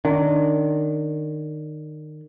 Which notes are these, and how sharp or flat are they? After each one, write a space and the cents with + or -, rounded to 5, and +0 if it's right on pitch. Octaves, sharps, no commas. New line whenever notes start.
D#3 -30 D4 -30